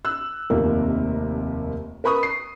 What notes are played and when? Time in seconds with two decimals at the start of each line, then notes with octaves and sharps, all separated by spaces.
0.05 E6 F#6
0.50 F1 D#2 C3 F4 A#4
2.04 A#4 B4 B5 C#6 D#6
2.23 C7